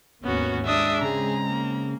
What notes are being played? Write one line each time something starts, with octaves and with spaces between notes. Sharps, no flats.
G#1 D#2 A#3 B3 C#4 F#4
G#3 D4 E5 D#6
C#3 C4 G#4 A#5
A#3